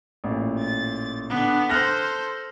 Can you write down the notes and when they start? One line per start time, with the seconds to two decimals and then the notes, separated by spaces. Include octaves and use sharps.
0.24 A1 A#2
0.59 A6
1.30 D3 B3 D4
1.69 A4 C5 F6 F#6 A#6